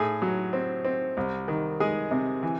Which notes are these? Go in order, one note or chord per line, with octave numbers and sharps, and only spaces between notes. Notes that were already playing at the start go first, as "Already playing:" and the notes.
Already playing: A2 G#4
F#3
C4
C4
C2
D#3
G#3 G#4
C3
E3